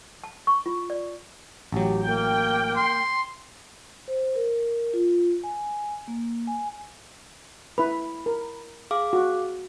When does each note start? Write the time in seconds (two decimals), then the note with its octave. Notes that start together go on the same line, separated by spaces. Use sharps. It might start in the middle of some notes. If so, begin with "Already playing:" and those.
0.24 A5
0.47 C#6
0.66 F4
0.90 D5
1.72 A1 F#3 G4
2.05 A#3 G5
2.76 C6
4.08 C5
4.35 A#4
4.94 F4
5.44 G#5
6.08 A#3
6.47 G#5
7.78 E4 B4 B5
8.26 A#4
8.91 G#4 F5 D6
9.13 F#4